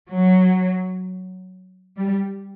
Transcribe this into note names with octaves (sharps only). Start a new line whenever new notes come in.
F#3
G3